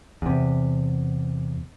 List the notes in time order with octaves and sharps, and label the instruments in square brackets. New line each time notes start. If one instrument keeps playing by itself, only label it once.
[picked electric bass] E2 C3